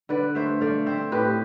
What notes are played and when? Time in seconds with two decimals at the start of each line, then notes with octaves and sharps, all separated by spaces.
0.09 D3 B4 D5
0.35 A3 C5 E5
0.61 A3 D5 F5
0.86 C4 C5 E5
1.12 A2 G4 B4